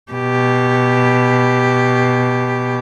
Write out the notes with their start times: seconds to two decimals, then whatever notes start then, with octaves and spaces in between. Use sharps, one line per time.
0.12 B2 G4